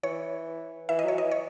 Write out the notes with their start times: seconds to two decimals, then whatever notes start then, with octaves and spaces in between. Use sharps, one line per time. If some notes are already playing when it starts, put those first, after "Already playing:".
0.03 E3 C#5
0.89 E3 E5
0.99 D#5
1.04 F#3 C#5
1.18 E3 D#5
1.31 C#5